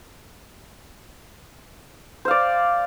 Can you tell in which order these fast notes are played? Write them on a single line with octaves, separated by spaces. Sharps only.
C5 F5 D5